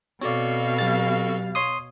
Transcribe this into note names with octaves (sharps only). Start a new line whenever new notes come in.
B2 C4 F#4 A4 C#5 D5 F5
F#3 G4 A6
C#5 C6 D#6